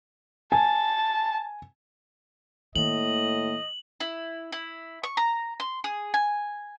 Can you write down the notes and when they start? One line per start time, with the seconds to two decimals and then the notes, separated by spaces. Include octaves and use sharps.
0.52 G#5 A5
2.75 A2 D#3 A#3 D#5 F#7
4.00 E4
4.52 E4
5.03 C#6
5.17 A#5
5.60 C6
5.84 G#4
6.14 G#5